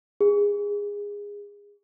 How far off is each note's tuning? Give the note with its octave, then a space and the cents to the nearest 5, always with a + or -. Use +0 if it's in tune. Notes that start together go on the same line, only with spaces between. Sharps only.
G#4 -20